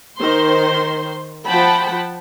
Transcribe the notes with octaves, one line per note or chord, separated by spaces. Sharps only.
D#3 C5 C6
F3 F#5 G5 A5 B5